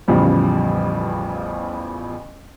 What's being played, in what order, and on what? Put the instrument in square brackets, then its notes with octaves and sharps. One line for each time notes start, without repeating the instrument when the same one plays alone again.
[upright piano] A1 E2 C#3 F3 G3